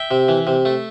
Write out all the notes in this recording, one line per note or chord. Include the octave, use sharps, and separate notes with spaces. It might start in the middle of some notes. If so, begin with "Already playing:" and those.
Already playing: E5 G5
C3
E3
C3
A3